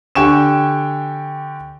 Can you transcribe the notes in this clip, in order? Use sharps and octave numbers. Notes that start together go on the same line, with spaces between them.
D3 G4 G5 G#5 C#6 E7